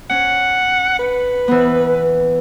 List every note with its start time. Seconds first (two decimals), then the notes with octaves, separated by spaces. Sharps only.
0.10 C#4 F#5
0.99 B4
1.48 E3 B3